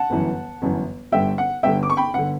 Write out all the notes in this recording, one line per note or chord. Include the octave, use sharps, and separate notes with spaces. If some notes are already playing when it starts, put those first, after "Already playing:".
Already playing: F#5 A5
G1 F#2 E3
G1 F#2 E3
G1 G2 D3 E5 G5
F#5
G1 G2 D3 E5 G5
D6
C#6
G5 B5
G1 D3 F#5